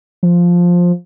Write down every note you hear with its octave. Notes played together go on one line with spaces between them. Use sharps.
F3